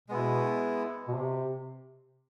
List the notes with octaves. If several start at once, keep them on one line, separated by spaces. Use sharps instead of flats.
B2 G#3 B3 E4
B2
C3